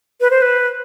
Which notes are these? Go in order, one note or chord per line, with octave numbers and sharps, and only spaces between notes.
B4
C5
B4